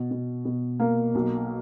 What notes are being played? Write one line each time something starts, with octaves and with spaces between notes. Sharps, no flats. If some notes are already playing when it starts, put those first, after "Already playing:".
Already playing: B2
B2
B2
A#3
B1